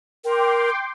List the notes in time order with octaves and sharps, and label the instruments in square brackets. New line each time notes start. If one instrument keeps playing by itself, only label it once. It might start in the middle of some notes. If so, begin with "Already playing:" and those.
[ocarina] A#4 [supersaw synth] G5 C6 D6